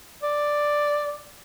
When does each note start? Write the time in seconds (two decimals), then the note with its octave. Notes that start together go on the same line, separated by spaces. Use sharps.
0.23 D5